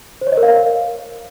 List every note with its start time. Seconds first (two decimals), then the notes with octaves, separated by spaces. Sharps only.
0.21 C5
0.27 C#5
0.32 D#5
0.37 A#4
0.43 F5